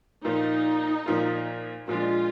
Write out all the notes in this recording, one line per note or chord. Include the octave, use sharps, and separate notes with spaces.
A#2 F3 A#3 D#4 F4
A#2 F3 A#3 F4
A#2 F3 G#3 D4 F4